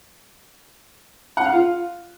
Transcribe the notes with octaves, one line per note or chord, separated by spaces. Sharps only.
F#5
F5
F4